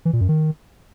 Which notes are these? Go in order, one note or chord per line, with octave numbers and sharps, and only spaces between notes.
E3
A#2
F#2
D#3